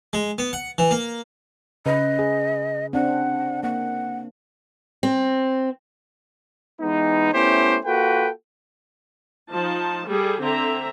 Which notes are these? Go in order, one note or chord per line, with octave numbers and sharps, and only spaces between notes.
G#3
B3
F#5
E3
A#3
C#3 B4 D#5
G#4
C4 D4 F#5
A#3 F#5
C4
E3 G#3 B3 D#4
A3 B3 C#4 E4 G4 C5
A#3 F4 F#4 A4 B4 G5
F3 D#4 A5
G3 G#4 A4
D3 C4 E5 A#5